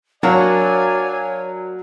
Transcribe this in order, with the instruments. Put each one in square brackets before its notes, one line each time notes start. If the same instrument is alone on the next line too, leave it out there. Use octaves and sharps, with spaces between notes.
[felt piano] F#3 [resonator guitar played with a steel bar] A#3 D4 F#4 [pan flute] C#5 [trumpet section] D5 F5 G#5